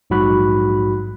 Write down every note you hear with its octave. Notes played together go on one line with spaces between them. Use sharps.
A#1 G#2 F#3 F#4 B5 F#6